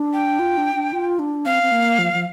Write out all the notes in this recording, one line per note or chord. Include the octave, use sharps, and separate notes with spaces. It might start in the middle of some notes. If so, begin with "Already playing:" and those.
Already playing: D4
G5
F4
D4
D4
F4
D4
C4 F5
C4
A#3
F3
F3